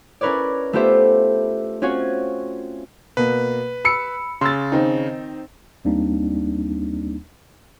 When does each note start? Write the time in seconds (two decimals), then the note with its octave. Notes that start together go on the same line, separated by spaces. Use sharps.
0.21 C#4 E4 A#4 B4 C#5 D5
0.73 A3 B3 F4 G4 C5 E5
1.82 C4 C#4 F4 F#4 C#5
3.17 B2 A#3 B4
3.85 B5 E6 C#7
4.41 C#3 C6 E6 A6
4.72 D#3 C4 D#4
5.85 D#2 G3 A#3 C4 D4 D#4